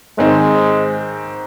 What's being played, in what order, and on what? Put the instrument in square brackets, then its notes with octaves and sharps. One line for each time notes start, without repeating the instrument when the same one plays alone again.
[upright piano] G#2 D#3 C4 [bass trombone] G#3